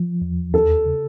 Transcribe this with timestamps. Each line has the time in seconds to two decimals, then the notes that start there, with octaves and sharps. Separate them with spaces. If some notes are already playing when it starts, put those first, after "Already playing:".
Already playing: F3
0.22 E2
0.53 D#2 A4
0.85 C#3